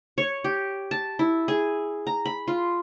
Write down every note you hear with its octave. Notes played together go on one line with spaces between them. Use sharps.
C#5
G4
A5
E4
G#4
A#5
B5
F4